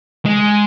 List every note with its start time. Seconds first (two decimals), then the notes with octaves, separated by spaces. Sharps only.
0.25 G#3